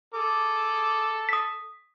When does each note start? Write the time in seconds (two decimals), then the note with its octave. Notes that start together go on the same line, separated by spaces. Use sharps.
0.14 G#4 A4 D6
1.29 D#6 B6